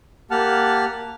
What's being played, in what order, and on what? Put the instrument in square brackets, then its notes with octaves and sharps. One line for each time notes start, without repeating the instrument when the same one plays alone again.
[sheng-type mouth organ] A#3 G4 F#5 A5 F6